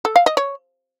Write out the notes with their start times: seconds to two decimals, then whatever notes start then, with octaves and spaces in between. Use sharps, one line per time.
0.05 A4
0.16 F5
0.26 D#5
0.37 C#5